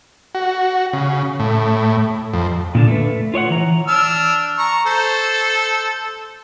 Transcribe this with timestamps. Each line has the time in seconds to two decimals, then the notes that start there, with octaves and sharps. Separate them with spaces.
0.35 F#4
0.93 C#3
1.40 A2
2.34 F2
2.75 A#2 D3 D4
2.88 A3 B4
3.34 F4 C#5 D5 F#5
3.51 E3 A#5
3.87 D4 E6 F6
4.58 A#5 C#6
4.86 A4 C5